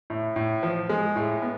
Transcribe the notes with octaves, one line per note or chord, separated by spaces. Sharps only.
A2
A2
F3
G#3
A2
B3